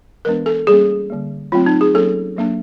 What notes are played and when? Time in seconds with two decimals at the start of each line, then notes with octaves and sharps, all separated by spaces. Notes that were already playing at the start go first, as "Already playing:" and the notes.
0.25 E3 G#3 B3 D4 A#4
0.46 A4
0.67 G3 A#3 C#4 G#4
1.10 D3 G3 A#3
1.52 F#3 A3 C4 F4
1.66 D#4
1.81 G#4
1.94 F#3 A#3 C#4 A4
2.37 F#3 A#3 D4